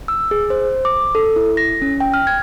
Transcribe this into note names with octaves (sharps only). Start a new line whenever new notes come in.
E6
G#4
C5
D6
A4
E4
A#6
C#4
G5
F6
G#6